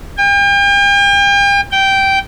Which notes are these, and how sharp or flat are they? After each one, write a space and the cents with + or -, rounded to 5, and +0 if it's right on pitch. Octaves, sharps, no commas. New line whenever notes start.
G5 +40
G5 -10